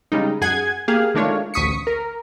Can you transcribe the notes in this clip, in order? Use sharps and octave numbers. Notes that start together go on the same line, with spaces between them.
C#3 G3 G#3 D#4
F#2 G#4 F#5 G#5 G#6
A#3 G4 G#4 F5
D#3 G#3 A3 D4 F4 C#5
A1 D2 C#6 D#6 B6 C#7
A#4